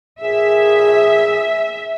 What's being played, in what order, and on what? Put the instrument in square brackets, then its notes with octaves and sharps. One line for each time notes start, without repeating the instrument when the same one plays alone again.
[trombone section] A#1 G#4 [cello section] E5